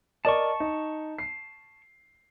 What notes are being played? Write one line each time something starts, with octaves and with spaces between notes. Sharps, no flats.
A#4 D5 D#5 A5 C#6
D#4
C7